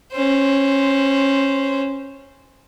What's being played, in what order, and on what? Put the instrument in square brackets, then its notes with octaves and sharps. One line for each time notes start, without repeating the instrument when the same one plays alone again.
[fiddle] C#4 C5